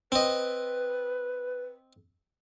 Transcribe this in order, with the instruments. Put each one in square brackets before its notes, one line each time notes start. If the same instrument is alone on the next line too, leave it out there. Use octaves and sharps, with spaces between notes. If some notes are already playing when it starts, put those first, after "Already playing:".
[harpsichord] C4 D#5 [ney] B4